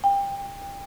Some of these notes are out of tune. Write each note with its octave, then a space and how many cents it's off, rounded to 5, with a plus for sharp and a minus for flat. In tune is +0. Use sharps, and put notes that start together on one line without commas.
G5 +25